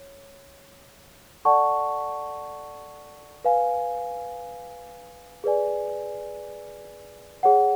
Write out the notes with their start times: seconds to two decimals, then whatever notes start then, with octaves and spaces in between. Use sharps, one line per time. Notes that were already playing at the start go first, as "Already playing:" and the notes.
Already playing: C#5
1.45 A4 D5 F#5 A5 C#6
3.45 B4 F5 G#5
5.44 G#4 B4 D5 G#5
7.43 G#4 C#5 F#5